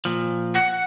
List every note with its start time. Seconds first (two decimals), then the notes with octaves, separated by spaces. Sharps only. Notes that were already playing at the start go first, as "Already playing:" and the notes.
0.05 A#2 F3
0.54 F#5